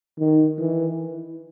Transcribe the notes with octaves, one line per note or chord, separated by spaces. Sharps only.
D#3
E3